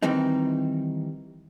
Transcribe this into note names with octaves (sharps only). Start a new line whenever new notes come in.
D#3 E3 G3 C4 D#4